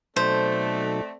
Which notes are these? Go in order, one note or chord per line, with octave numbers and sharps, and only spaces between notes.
B2 F#3 A3 C4 D#4 A4 C5 D5